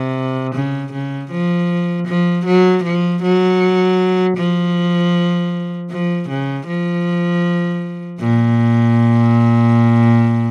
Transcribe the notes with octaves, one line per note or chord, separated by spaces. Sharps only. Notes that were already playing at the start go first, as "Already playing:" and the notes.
Already playing: C3
C#3
C#3
F3
F3
F#3
F3
F#3
F3
F3
C#3
F3
A#2